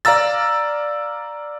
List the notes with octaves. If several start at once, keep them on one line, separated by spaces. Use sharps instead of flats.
D5 F5 A#5 E6 A6